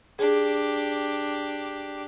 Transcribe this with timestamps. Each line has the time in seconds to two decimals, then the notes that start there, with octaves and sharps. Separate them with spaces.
0.19 D4 G4 G#4